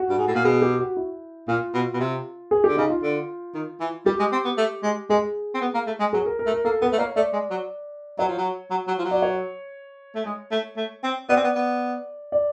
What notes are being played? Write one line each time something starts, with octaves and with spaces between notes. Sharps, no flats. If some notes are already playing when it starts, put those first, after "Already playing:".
Already playing: F#4
G2
G#2
A2
A#2
B2 G#4
G4
F#4
E4
A#2 F4
B2
B2
C3
G#4
D3 G4
C#3 D#4
F4
D3
D#3
E3
G3 G4
G#3
C4
B3
A3
G#3
G#3 G#4
C4
B3
A#3
A3
G#3
F#3 G#4
A#4
A#4
A3
A#4
A#3 A4
B3 B4
A3
A#3 C#5
A3 D5
G#3
F#3
F#3 C#5
F3
F#3
F#3
F#3
F3
F#3
D5
C#5
A3
G#3
A3
A3
C4
B3 D5
C4
B3
B3
D5